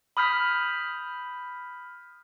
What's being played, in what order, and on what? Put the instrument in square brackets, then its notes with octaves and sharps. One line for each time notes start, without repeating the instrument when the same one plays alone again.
[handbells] B5 D#6 F6 G6 B6